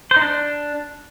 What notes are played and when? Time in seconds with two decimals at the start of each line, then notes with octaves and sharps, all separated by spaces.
0.11 C5
0.16 D#4
0.21 D4